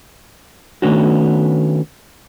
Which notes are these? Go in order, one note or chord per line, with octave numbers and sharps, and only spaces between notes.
D#3 A3 B3 C#4 D4 F#4